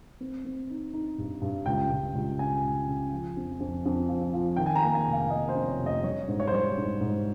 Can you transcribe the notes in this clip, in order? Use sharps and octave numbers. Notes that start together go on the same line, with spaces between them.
C4
C4
D#4
D#4
G2
G2
C#2 G5
C#2
C#2
C#3 G#5
C#2
C#3
F3
F2
F2
F2
F3
F3
D#3 G5
G#5
A#5
A#3
G#5
F1
F5
A#3 D#5
C5
F2
C#5
F1
D#5
G3 C#5
G#2
C#5
C5
G3 C#5
G#2
G#2